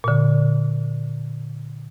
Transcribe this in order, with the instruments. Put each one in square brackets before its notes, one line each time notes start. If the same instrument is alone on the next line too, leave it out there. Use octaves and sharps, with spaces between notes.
[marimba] A#2 D3